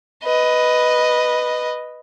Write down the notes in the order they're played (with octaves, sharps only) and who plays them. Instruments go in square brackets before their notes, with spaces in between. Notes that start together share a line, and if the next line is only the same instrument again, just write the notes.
[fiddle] B4 D#5